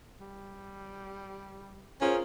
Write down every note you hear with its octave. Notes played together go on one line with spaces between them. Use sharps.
G3
C#4 F4 G#4 A#4 C5